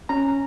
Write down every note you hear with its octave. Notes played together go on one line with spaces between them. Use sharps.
C#4 A#5